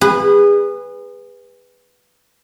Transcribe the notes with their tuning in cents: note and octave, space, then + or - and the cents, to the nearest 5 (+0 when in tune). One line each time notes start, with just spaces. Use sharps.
G#4 -30 B4 +0